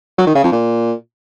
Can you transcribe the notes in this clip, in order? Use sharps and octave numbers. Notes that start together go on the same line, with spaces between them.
F#3
D#3
C#3
F2
A#2